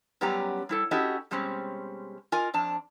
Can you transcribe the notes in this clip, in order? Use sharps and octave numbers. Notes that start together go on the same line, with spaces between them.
F#2 G3 B3 C#4 G4 A#5
G3 E4 A4
C#4 E4 F#4 G4 A4 D#5
B2 G3 G#3 C4 C#4
F4 A#4 D#5 G#5
F2 D4 A5